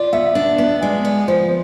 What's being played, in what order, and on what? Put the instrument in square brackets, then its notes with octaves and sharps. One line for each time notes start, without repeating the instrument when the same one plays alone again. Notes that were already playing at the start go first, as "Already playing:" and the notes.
Already playing: [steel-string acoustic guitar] F4 [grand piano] D5
[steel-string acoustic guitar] B3 [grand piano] E5
[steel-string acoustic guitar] D4
B3
[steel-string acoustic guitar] G#3 [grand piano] D5
[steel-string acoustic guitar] B3
[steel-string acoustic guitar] F3 [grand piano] C5